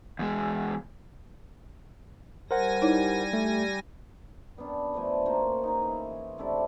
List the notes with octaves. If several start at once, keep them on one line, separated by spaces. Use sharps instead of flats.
E2 G#3
G3 A#4 C5 F#5 G#5 A#6
D#4 E4 C#5
A3
G3 B3 C#4 D4
D3 F3 A3 G#5
A#3 C#4 F#4 C5
D#4 G#4
E3
C3 A3 D4 E4